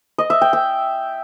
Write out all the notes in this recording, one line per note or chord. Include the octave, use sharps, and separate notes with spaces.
D#5
E5
G5
G5